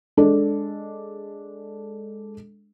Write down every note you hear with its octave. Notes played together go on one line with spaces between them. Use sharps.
G#3 D4 A4